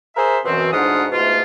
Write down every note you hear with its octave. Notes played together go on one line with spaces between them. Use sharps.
G#4 A#4 C5 E5
F#2 B2 E3 C4
D2 G#2 D4 F4 F#5 D#6
G#2 B2 A3 F4